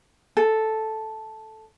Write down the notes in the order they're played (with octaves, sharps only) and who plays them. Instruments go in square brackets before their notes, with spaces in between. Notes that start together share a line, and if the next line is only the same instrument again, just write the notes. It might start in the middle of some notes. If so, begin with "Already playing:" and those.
[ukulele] A4